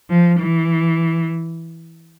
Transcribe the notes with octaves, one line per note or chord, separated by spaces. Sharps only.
F3
E3